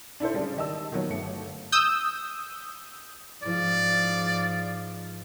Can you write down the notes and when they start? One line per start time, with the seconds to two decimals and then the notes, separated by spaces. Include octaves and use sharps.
0.20 D4 E4 A4 C5
0.34 C#3 G3 G#3 D4
0.56 D#3 G4 D#5 A5 E6
0.92 D#3 F3 F#3 B3
1.09 G1 A3 C#7
1.72 D#6 E6 G6
3.43 G#2 F3 D5